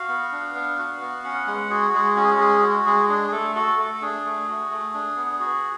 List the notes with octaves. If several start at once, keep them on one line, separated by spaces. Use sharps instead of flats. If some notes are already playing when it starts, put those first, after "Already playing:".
Already playing: F#4 F5
B3
D4
B3
F#4
B3
C#4 F#5
G#3 F#5
F#4 G#4
G#3 G#4
C#4 F#4
G#4
F#4
G#3 G#4
F#4
G#3 G#4
D4 G#4
G#4
A3 A4
F#4 A4
A3 A4
D4 G#4
A3
F#4
A3
D4
B3
F#4